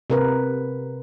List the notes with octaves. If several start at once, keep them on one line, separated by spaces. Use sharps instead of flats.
C3 A#4 B4